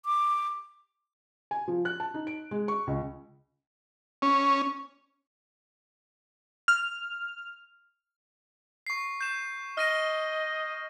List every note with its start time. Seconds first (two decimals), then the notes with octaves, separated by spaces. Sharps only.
0.05 D6
1.51 G#5
1.68 F3
1.85 F#6
2.00 A5
2.14 D#4
2.27 D7
2.51 G#3
2.68 C#6
2.87 C#2
4.22 C#4
6.68 F6
8.87 C#6 C7
9.21 G6 E7
9.77 D#5 F6 A#6 D#7